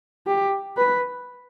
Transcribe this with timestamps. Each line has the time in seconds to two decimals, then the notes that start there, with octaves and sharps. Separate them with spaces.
0.27 G4
0.77 B4